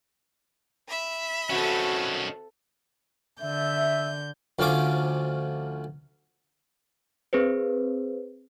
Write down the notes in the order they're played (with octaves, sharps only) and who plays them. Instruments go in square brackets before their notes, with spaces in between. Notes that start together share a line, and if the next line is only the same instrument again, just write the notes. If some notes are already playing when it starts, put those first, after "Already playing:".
[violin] E5 B5
[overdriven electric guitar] D#3 C#4 [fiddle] C4 A4 [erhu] F#4
[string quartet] D3 G6 [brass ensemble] E5
[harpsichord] D2 F3 C#4 D6
[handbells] C4 G#4 B4 C5